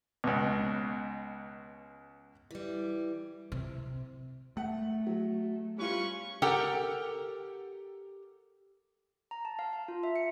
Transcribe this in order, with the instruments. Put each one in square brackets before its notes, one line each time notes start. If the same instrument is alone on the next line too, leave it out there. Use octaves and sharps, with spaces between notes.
[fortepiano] C#2 B2
[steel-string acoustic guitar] E3 G3
[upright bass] C3
[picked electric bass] A3 [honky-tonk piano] F#5
[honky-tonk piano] F#3
[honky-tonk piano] G3 F4 [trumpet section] C#4 B4 C#6
[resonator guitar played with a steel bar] G4 A4 A#4 F#5 G5
[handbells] A#5
A5
F5
F5
F4
E5
C#7